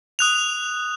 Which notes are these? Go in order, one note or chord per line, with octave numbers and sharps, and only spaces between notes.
D#6 F#6 F7